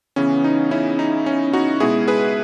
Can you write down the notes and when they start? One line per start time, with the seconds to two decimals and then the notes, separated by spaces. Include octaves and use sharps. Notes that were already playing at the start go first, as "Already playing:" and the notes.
0.16 C#3 E3 B3 C#4
0.44 D#4
0.71 C#4 E4
0.99 D#4
1.26 C#4
1.53 D#4 F#4
1.80 B2 G#3 B3 E4 G#4
2.08 G#4 B4